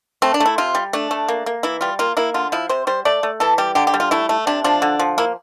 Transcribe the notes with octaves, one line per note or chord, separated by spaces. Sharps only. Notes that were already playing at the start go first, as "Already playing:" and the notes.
A3 C4
D4
A3
E4
C3 F4
G3
A3 D4
A3
A#3
A#3
E3 E4
G3 F4
A#3 F4
A#3 E4
D3 F4
F3 E4
C3 C5
G3 C5
A3 D5
A3
E3 A4
G3 G4
D3 G4
G4
G3
F4
A3 E4
A3
C3 D4
F3 D4
D3
F3
A#3 E4